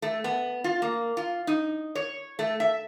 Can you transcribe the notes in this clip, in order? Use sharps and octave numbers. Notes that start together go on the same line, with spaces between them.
A3
B3
F4
A#3
F4
D#4
C#5
A3
E5